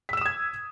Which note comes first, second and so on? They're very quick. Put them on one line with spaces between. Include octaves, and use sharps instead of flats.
B6 E6 E7 D#6 G#6